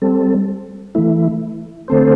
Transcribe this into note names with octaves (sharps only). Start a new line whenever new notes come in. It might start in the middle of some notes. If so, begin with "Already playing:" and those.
G3 C4 A4
E3 A3 E4
D3 A3 C4 A4 C5